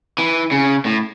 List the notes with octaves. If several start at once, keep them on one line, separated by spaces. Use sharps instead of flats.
E3
C#3
A2